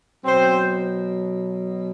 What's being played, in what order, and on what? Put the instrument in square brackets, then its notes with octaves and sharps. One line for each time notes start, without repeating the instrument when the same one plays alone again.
[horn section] B2 F#3 C4 C5